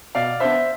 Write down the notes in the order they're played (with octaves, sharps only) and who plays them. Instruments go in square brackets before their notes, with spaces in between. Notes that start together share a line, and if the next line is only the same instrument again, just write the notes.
[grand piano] B2 D5 F5
B3 D4 C5 E5